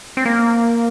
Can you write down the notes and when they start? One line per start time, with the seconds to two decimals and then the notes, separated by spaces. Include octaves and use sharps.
0.17 C4
0.25 A#3